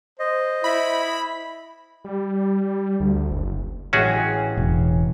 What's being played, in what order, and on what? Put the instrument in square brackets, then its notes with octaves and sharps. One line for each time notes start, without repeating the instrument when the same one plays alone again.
[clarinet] C5 [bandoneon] D#5
[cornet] E4 [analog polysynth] B5
[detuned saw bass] G3
D2
F#1
[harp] A1 G#3 G5 [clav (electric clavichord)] C#4 F#4 G#4
[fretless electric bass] E1